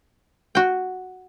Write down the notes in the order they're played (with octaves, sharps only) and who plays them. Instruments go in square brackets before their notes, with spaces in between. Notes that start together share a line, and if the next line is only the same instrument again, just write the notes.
[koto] F#4 G5